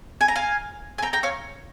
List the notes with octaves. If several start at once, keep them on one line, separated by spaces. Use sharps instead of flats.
G#5
A#5
F5 G#5
G#5
G5 A#5
G5 A#5
C#5 F5